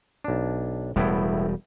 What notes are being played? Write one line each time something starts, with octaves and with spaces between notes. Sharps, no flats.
B1 D4
E1 A2 G3 B3 E4